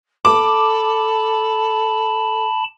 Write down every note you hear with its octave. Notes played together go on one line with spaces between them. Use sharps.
A4 A5 B5 D6